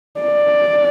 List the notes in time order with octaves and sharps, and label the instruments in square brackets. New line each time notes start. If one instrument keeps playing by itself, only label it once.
[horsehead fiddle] D5